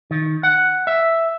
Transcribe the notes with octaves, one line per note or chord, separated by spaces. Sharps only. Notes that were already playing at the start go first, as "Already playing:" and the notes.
D#3
F#5
E5